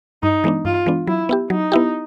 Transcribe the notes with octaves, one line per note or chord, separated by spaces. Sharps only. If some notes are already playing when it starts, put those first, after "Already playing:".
G2 D#4
E3 G#3 B3 D4
G2 F4
E3 G#3 B3 D4
F#3 E4
B3 E4 G4
F#3 D#4
B3 E4 G4